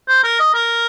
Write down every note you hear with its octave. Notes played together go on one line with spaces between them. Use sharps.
C5
A#4
D#5
A#4